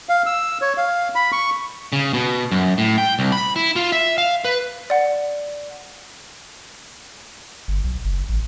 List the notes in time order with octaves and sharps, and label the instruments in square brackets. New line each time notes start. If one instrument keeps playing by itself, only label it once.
[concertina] F5
E6
C#5
F5
B5
C#6
[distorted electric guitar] C#3
B2
F#2
A2
G5
C2
B5
E4
F4
E5
F5
B4
[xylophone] D5 F#5
[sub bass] G1
B1
F#1
A1